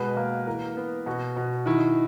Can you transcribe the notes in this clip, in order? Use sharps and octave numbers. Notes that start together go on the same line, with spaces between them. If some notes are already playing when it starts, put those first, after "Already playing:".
Already playing: B2 G#3 B4
A#3
E3 A#4
B3
B2 F#4
B2
D#3 E4